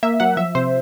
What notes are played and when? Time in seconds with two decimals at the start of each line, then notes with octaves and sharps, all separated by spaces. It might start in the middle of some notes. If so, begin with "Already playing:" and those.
0.03 A#3 E5
0.20 F#3 F#5
0.37 F3 E5
0.55 C3 C5